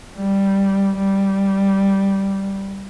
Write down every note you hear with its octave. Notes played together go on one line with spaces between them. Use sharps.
G3
G3